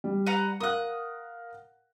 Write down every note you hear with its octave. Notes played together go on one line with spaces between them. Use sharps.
G3
B4 F#5 A#5
A#4 F5 F#5 D#6 F#6